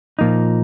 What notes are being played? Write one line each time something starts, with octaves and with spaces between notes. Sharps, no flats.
A#2 F3 A#3 D#4